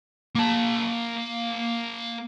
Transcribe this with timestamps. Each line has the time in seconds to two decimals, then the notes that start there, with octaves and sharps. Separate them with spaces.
0.35 A#3 A5